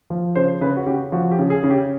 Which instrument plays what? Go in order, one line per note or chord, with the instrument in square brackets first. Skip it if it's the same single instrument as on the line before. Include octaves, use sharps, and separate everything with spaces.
[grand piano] F3
C#3 C5
C#3 B4
F#4
C#3 G4
F3 F#4
G4
C#3
G#4
C#3
G4